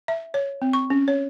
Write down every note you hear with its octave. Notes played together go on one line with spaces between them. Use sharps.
E5
C#5
C4
C#6
C#4
C#5